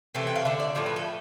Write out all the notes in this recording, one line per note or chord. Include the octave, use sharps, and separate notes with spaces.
C3 E3 A3
G5
F5
D3 A3 E5
D5
A2 F3 A3 D5
B4
A4